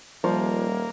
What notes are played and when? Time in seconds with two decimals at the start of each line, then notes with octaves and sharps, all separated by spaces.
0.24 D#1 F3 G3 A#3